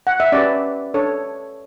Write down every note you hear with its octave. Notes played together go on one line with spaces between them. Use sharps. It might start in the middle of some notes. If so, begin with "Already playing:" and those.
F#5
E5
C#4 G4 B4 D5
D4 A4 C#5